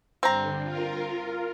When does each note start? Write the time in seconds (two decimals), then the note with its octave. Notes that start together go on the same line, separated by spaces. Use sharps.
0.23 G2 D3 C4 A#5
0.62 F4 A#4